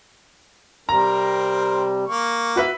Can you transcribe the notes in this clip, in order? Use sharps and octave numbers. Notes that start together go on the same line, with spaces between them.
C3 G3 C4 A#4 A#5
A#3 C#6
F#4 B4 E5